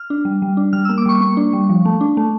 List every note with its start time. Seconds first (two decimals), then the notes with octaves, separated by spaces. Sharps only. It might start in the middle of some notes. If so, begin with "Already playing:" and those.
Already playing: F6
0.10 D4
0.25 G3
0.42 G3
0.57 D4
0.73 G3 F6
0.85 A#3 E6
0.98 D6
1.06 G3 C#6
1.21 A#3 C#6
1.37 D4
1.53 G3
1.69 F3
1.85 A3
2.01 D4
2.17 A3